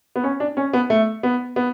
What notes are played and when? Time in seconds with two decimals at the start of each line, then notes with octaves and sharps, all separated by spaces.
0.16 B3
0.24 C#4
0.40 D4
0.57 C#4
0.73 B3
0.90 A3
1.23 B3
1.56 B3